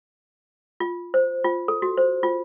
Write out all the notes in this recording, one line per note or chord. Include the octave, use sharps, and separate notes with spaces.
F4
C5
F4
A4
F#4
C5
F4